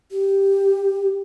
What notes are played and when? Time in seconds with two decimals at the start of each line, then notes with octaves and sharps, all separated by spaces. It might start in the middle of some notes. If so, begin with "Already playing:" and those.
0.12 G4